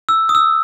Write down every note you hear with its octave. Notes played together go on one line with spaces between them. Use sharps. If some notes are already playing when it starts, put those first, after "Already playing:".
E6
D#6
E6